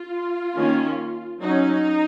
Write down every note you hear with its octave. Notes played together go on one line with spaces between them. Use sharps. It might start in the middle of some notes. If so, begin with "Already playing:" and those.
Already playing: F4
D#3 A#3 C#4
F#3 C#4 D#4